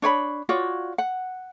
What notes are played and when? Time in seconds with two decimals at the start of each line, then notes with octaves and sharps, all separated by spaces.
0.02 D4 C#5 D5 B5
0.49 F4 F#4 C#5 D5
0.98 F#5